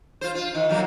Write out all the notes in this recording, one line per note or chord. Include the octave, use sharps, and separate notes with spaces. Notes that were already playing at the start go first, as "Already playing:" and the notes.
F4 C5
F4
D#3
C3 F#3 A#3